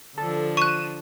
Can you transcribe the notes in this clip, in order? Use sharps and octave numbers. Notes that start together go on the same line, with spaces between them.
D3 F3 D4 A4
C#6 F#6 D#7 E7